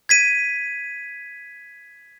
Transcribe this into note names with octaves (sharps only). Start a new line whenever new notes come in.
G#6 B6 D#7